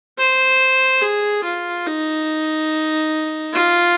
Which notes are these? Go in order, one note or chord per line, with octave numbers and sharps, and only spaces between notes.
C5
G#4
F4
D#4
F4